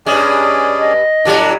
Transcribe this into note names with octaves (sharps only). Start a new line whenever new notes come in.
G2 G#3 C#4 G#4 D5
D#5
A2 F#3 G3 D4